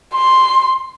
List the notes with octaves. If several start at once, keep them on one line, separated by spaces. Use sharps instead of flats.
C6